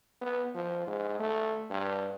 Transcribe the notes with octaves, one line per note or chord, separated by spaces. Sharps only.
B3
F3
G#2
A3
G2